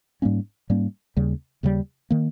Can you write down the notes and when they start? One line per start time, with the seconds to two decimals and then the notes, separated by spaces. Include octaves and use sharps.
0.22 G#2 G3 A#3 C#4
0.70 G#2 G3 A#3 C#4
1.17 D#2 C#3 G3
1.63 D#2 C#3 G3
2.10 D#3 A#3